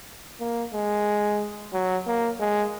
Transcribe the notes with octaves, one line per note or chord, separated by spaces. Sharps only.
A#3
G#3
F#3
A#3
G#3